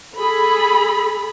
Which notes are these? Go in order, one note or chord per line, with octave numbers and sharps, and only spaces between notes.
G#4 A4 B5